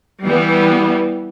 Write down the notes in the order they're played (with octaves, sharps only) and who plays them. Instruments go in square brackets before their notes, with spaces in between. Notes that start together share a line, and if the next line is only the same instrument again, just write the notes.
[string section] E3 G3 B3